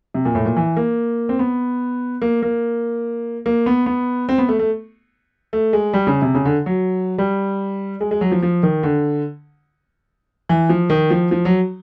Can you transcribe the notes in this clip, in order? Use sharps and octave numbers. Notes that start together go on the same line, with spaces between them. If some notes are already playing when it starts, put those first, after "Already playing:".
C3
A#2
A2
A#2
E3
A#3
C4
B3
A#3
A#3
A#3
B3
B3
C4
B3
A3
A3
A3
G#3
G3
C#3
C3
C#3
D3
F#3
G3
G#3
G#3
F#3
F3
F3
D#3
D3
E3
F3
D#3
F3
F3
F#3